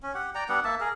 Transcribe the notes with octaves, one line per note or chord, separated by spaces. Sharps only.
C#4
G4 F#5
D5 G5 A#5
G3 B3 D4 F#5
A#3 E5 A5
G#4 A#4